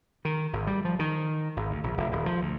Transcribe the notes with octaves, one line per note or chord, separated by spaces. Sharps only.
D#3
G#1
G3
F3
D#3
G#1
D2
A#1
F1
D#1
F3
D2